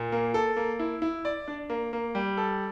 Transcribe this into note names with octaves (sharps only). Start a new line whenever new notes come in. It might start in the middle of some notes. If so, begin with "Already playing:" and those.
Already playing: A#2
A#3
A4
A#3
E4
E4
D5
D4
A#3
A#3
G3
A4